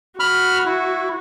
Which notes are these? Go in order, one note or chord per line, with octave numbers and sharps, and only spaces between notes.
F#4 B5 F6
E4